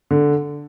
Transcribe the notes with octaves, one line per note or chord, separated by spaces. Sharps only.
D3